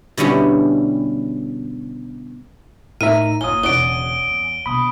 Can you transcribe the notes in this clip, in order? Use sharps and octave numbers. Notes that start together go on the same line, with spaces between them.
B2 D3 G3 C#4 E4
A2 D#4 A#4 E5 A#5 D#7
F#1 A#2 F#3 F4 G#5 D#6 G7
E1 C#3 C#4 F#4 D5 D7 G7
E2
B2 D3 B5 D#6